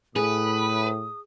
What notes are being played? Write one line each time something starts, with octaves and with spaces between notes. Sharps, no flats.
A2 G#4 B4 D#6